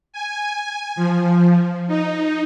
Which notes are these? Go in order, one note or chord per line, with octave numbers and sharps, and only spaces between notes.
G#5
F3
D#4